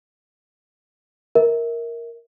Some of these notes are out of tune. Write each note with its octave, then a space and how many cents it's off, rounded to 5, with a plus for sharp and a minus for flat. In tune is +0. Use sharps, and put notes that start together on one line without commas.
A#4 +0 E5 -25